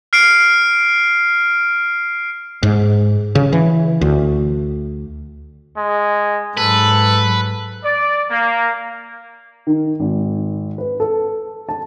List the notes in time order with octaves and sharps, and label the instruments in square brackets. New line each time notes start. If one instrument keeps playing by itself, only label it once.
[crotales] F6 C7 D7
[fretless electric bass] G#2
C#3
E3
D2
[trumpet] G#3
[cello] G#2 F#3 [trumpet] A4 [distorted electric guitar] B4
[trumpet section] D5
A#3
[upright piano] D#3
G#1
B4
A4
A5